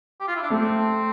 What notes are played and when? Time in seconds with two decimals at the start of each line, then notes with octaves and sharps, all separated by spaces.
0.20 G4
0.28 F4
0.35 E4
0.42 D4
0.50 A3 C4